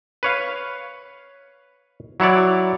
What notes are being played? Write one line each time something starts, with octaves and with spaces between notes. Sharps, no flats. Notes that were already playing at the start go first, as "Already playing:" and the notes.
B4 C#5 F5
F#3 E4 C#5 D5